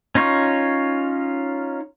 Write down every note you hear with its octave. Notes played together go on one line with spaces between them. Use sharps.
C#4 D#4 F4 C#5